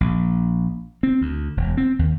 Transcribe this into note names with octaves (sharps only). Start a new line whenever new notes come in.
A#1
C4
D2
E1
C4
D#2